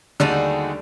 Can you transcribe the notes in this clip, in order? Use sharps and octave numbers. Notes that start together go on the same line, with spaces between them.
D#2 D3 G3 A3 D#4 F#4 G#4